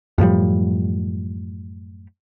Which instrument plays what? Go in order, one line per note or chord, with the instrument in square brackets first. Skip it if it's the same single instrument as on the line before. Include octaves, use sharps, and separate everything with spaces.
[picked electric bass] F#2 A2 F3 G3